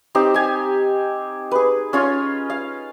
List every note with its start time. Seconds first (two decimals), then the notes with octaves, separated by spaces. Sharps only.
0.15 C4 D#4 G4 C5
0.34 G4 G#5
1.51 G#4 B4
1.93 C#4 F4 C#5
2.50 F5